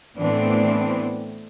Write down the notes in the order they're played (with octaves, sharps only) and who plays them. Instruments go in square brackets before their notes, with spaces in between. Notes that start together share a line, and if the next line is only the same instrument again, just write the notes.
[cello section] A2 E3 A3 B3 C4 D4